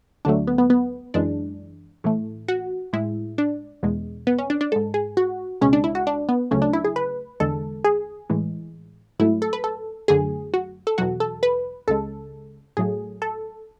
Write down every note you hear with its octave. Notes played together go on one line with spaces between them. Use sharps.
D2 D3 F#3 A3 D4
B3
B3
B3
F#2 E3 G#3 D4
A2 E3 A3
F#4
A2 G#3 E4
D4
E2 B2 G#3
B3
C#4
D4
D4
G#2 G#3 A4
G#4
F#4
C#2 B2 G#3 C#4
D4
E4
F#4
D4
B3
D2 C#3 F#3 A3 C#4
D4
E4
G#4
B4
E2 D3 G#3 A4
G#4
A2 E3 G#3
G#2 F#3 A3 E4
A4
B4
A4
F#2 D3 F#3 A3 G#4
F#4
A4
E2 B2 F#3 F#4
A4
B4
C#2 C#3 G#3 A4
A2 F#3 A3 G#4
A4